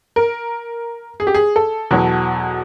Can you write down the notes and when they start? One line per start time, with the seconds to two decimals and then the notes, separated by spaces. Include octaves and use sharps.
0.16 A#4
1.20 G#4
1.27 G4
1.35 G#4
1.56 A4
1.91 E2 B2 F#3